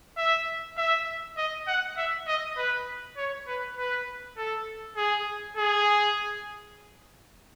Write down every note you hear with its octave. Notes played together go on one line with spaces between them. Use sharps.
E5
E5
D#5
F#5
E5
D#5
B4
C#5
B4
B4
A4
G#4
G#4